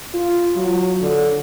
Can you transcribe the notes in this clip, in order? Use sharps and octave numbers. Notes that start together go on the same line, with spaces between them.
F4
F#3
D3